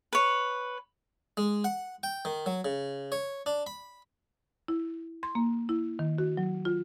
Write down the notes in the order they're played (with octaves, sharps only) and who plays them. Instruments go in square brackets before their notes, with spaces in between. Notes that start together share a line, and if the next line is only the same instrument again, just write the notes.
[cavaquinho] B4 C#5
[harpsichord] G#3
F#5
G5
D#3
F#3
C#3
C#5
D4
B5
[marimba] E4
C6
A#3
E4
D#3
F#4
F#3
F4